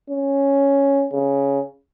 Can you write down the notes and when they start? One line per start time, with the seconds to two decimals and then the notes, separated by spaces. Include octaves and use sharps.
0.10 C#4
1.13 C#3